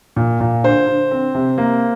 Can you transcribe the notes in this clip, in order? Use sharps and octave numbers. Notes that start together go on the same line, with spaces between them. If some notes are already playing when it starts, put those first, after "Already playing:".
A#2
A#2
D3 C5
D3
C4
C3
A#3